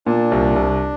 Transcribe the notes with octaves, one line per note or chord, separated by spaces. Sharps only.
A#2 D4
C2
C2